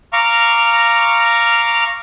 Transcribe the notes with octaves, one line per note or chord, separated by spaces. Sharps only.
F5 A#5 C#6 D6